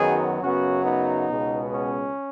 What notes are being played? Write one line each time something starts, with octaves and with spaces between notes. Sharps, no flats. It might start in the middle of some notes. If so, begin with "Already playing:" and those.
Already playing: F#2 D#3 F#3 B3 D#4 G#4
F#2 C#3 F#3 B3 C#4 F#4
B3 D#4
C#2 B2 G#3 B3
C#4